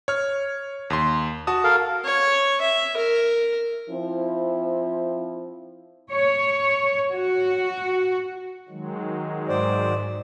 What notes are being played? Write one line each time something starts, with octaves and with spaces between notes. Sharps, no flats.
C#5 F6
D#2 C6
F#4 A5 D#6
A4 A#4 F5
C#5
E5
A#4
F3 C4 E4
C#5
F#4
D#3 F#3 G#3
G#2 C5 D5